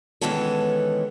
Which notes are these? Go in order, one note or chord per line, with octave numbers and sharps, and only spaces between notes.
D#3 E3 G#3 B3 C#4 A4